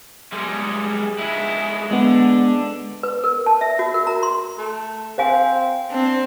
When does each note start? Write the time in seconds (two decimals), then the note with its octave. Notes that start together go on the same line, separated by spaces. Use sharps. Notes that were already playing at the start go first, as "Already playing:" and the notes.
0.32 G3 G#3
1.19 G#3 E4
1.91 D3 G#3 B3
3.03 B4
3.24 A#4
3.46 A5
3.61 E5
3.79 F#4
3.94 A#4
4.07 A#5
4.23 C6
4.58 A3
5.18 C4 C5 F5 G#5
5.91 C4 D4